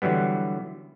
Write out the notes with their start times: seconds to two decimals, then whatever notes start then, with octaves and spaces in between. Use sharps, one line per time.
0.02 D3 E3 F#3 G3 B3